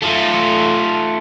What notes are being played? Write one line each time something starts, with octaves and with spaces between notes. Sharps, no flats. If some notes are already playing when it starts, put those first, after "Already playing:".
A3 F4